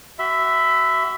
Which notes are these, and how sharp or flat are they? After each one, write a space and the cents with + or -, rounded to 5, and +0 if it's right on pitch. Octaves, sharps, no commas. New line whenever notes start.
F#4 +25 E5 +0 B5 +35